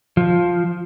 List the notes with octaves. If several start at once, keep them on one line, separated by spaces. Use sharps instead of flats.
F3